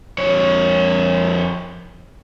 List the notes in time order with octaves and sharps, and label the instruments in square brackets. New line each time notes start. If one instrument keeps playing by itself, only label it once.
[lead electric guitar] F2 C#5